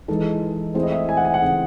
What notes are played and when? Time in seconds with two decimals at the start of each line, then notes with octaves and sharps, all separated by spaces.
0.08 E3 G#3 D#4 A4
0.75 E3 A3 C4 E4 G#4 C5
0.83 D#5
0.92 E5
1.09 G#5
1.17 F#5
1.25 G#5
1.34 F#5
1.42 C#3 E3 C4 D#4 G#4